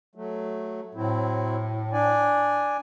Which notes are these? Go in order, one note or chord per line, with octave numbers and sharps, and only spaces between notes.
F#3 A3
A2 F#3 C4 E4
D4 D5 G#5